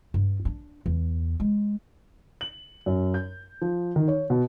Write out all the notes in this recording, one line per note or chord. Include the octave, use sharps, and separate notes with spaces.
G2
D4
E2
G#3
F#7
F#2
G6
F3
D#3
C#5
B2